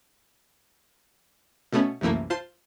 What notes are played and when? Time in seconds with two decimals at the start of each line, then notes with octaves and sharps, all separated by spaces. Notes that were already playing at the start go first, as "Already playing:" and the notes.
1.73 B2 A3 B3 C#4
2.01 C2 F#2 E3 A3 A#3
2.30 F4 C5 A5 C6